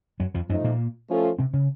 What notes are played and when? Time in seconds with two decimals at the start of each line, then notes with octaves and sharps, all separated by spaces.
0.20 F#2 F#3
0.34 F2 F3
0.49 F#2 F3 F#3 A3 D#4
0.64 A#2 A#3
1.09 F3 A3 C#4 F4 A4
1.39 C3 C4
1.54 C#3 C#4